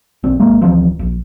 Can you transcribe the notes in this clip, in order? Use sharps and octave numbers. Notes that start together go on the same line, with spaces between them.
A#1 C4
G#1 G#3 A#3
D1 E3 F3 C4
A#1